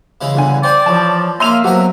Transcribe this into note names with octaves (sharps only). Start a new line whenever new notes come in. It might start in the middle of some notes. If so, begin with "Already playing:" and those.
C#3 E3 G#3
G1 D3 G#5
C5 D5 G5 G#5 G6
E3 F3 C#5 A5
A#3 C#5 E5 F5 C6 D#7 F7
F3 F#3 A#3 B3 F#4 A#4